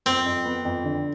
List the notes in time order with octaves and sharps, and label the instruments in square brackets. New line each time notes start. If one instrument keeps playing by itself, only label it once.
[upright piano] F2 [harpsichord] C4
[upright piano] F2
B3
F2
D3